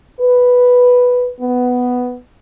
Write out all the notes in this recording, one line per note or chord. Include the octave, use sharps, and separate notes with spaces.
B4
B3